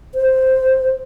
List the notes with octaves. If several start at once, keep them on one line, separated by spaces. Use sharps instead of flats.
C5